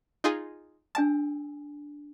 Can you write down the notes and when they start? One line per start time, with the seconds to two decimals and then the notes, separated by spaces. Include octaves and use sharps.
0.24 D#4 F4 G#4
0.95 D4 G#5 A5 E6